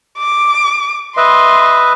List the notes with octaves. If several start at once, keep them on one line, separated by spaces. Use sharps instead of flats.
D6
B4 D#5 E5 C6